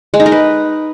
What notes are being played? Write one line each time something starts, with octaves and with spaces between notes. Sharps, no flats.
G#3
D#4
A#4
B4